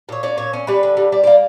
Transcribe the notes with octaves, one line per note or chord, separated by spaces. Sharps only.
A#2 C#5
C#4 D5
A#2 C#5
C#4
G3 B4
D3
G3
G3 D5
A#3 D5